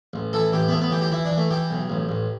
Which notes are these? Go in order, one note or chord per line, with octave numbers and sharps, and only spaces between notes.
A1
E3 A4
A1 G4
B3
A1 A3
B3
E3 G4
G4
E3 E4
D4
E3
A3
E3 G4
B1
A1
A1